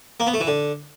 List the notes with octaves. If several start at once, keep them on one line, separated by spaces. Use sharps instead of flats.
A#3
B3
A3
E3
D3